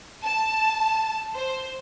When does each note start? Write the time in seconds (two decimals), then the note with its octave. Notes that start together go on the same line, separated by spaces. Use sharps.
0.24 A5
1.33 C5